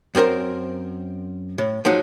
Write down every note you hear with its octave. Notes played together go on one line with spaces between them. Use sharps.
F#2 C4 C#4 A#4 C5
A2
F3 F#3 G#3 D#4 F#4